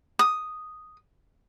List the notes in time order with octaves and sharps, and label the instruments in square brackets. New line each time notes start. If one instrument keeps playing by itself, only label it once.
[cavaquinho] D#6